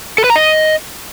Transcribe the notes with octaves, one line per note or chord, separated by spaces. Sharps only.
A4
B4
A#5
D#5